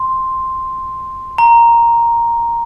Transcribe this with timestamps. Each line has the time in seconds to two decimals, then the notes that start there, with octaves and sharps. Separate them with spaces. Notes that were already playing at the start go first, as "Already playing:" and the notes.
Already playing: C6
1.38 A#5